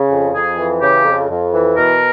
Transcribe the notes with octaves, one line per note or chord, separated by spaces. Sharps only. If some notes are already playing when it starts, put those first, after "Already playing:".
Already playing: C#3
F2
F2 G#4
E3
C#3 G4
F2
F2
E3
B2 A#4